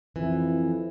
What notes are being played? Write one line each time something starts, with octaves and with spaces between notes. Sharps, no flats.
F2 E3